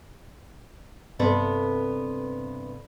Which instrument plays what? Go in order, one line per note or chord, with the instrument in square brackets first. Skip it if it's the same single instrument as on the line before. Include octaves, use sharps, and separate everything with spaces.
[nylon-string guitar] G2 C3 B3 A4 D5